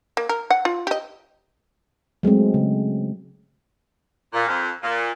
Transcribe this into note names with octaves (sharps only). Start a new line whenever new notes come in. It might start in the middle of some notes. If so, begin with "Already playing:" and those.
A#3
A#4
F#5
F4
G4 D#5
F#3 G#3 A3 C4
C#3
A#2
F2
A#2